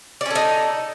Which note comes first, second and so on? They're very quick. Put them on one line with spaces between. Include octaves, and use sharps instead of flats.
D5 C#4 A4 D#4